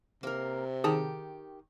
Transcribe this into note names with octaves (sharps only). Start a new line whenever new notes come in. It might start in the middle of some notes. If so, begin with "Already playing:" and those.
C3 A#3 A#4
D#3 G4 G#4 A5